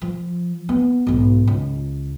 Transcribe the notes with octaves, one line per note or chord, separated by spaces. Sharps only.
F3
B3
B1 G#2
C#2